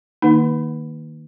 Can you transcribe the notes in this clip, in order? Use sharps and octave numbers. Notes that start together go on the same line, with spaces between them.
D#3 A#3 D#4